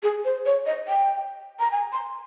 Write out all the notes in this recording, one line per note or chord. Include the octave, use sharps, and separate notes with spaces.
G#4
C5
C#5
D#5
G5
A#5
G#5
C6